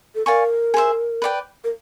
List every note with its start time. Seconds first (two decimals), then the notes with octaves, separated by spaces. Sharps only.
0.15 A4
0.26 A#4 D5 F5 G#5 C#6
0.74 G#4 C5 E5
1.22 B4 D5 G5
1.64 A#4